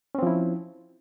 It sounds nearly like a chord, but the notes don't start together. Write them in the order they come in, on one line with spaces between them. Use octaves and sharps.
C#4 C4 F3 E4